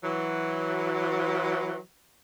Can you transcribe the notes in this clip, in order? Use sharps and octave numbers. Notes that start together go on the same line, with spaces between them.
E3 F#3